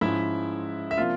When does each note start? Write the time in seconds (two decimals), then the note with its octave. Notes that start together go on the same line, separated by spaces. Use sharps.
0.01 G#2 F3 G#3 C#4 E4 E5
0.91 E5
0.97 C3 F3 A#3 D4 F4 F5